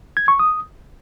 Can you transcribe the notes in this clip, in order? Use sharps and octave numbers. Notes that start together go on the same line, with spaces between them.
G#6
C#6
D#6